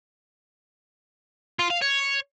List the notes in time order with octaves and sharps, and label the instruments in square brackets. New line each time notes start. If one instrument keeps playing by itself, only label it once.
[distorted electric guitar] F4
F5
C#5